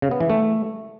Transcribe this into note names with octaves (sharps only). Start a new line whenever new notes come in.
C#3
B3
E3
A3